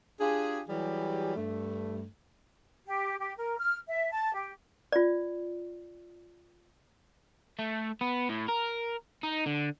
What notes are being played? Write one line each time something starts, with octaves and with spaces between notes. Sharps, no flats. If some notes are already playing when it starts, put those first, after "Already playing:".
D4 F4 G4 G#4
E3 F#3 G3 G4 G#4
G2 A3
G4
G4
A#4
F6
E5
A5
G4
F4 D5
A3
B3
A2
A#4
D#4
D3